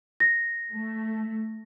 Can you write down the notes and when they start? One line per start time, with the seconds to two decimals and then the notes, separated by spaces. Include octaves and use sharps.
0.20 A#6
0.72 A3